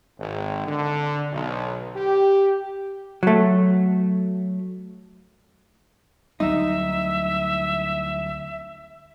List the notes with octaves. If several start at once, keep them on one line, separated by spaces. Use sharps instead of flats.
G#1
D3
B1
G4
F#3 A3
D2 F#3 G3 D#4 E5